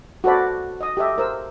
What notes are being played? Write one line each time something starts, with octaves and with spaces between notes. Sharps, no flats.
F#4 A4 C5 D5 B5
D#5 D#6
G4 A4 D#5 E5
A#4 C5 E6